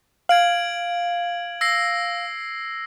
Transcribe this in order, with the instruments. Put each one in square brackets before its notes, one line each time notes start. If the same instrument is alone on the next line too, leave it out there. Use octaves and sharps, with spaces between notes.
[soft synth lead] F5 [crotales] G#6 D7 F#7
[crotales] E6 A#6 C7